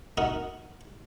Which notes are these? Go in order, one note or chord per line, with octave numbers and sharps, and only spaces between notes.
D#4 F#4 A#4